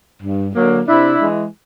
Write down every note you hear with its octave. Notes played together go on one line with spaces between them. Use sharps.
G2
D3 F#3 A#3
C3 D4 E4
E3 G#3